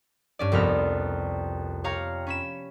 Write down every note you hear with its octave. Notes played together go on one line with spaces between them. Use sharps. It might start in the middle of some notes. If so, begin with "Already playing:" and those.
G2 C#4 D5
C2 F2 B3 B5 F6 A#6
G4 C#5 F5 A#5
C#4 B5 E7